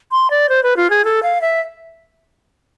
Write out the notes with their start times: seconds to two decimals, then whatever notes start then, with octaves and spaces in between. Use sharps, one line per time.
0.12 C6
0.30 D5
0.49 C5
0.63 B4
0.77 F4
0.90 G#4
1.05 A4
1.23 F5
1.41 E5